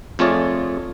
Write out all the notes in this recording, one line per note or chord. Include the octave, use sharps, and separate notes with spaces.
F2 A3 F4 G#4 C#5 D5